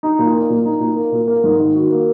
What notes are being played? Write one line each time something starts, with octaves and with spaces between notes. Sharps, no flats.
D#4
A#2
A#3
A#2
D#4
A#2
A#3
A#2
A#3
G#2
D#3
F#4
A#3